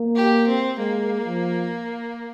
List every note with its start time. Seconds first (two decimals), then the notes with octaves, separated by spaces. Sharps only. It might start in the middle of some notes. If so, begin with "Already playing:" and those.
Already playing: A#3
0.16 G4
0.47 C4
0.78 G#3 A#3
1.26 F3